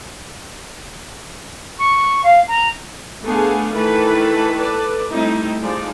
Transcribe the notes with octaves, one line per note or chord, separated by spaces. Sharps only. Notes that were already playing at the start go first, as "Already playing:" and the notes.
C#6
F5
A#5
A3 B3 D4 G#4 F5
D#3 E3 A3 A4 B4 B5
A4 B4 D5
G3 A3 C4 D#4 E4
F3 G#3 D#4 D5